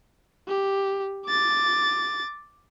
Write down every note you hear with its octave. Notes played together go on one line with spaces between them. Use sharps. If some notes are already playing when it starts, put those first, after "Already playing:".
G4
D6 A6